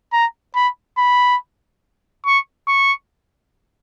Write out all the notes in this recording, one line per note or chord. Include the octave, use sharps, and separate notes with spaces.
A#5
B5
B5
C#6
C#6